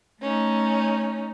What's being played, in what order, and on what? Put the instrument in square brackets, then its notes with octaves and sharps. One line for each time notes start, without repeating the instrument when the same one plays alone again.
[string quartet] A3 C#4 D#4